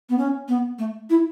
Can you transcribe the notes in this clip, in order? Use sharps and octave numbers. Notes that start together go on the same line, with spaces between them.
B3
C#4
B3
A3
E4